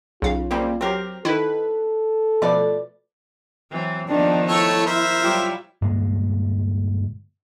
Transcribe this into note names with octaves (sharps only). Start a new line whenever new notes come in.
B1 C#3 F4 F5
C#3 F3 G3 A#3 C4
F#3 C4 G4 A#4
D#3 E4 A4 B4
B2 F3 A3 B4 D5
E3 F#3 C4
D#3 F3 B3 D4
A3 E4 A4 C#5
A#4 C5 E5
F#3 G3 E4 F4
G2 A#2 D3 G#3